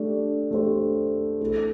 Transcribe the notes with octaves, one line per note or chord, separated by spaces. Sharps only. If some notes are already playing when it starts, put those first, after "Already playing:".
Already playing: A3 D4 G4
A3 D4 G4 C5
A3 E4 A4